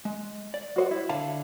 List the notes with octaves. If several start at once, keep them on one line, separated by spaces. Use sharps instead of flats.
G#3
D5
F#4 C5 F#5
E4
D3 F5 A5